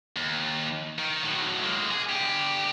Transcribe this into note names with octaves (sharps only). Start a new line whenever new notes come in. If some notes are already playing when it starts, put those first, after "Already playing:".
D#2
D#3
A2 F#3
G#3 A#3
G#4
D3 G4